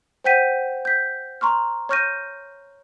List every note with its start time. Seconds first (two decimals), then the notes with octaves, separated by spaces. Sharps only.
0.24 C5 F#5 G5 G6 B6 D#7
0.85 G6 B6
1.41 A#5 C6 C#6 F6
1.89 C#5 C#6 F6 G6 A#6 D#7